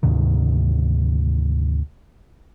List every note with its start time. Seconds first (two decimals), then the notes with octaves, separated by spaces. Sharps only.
0.03 D2 G#2 C3 D#3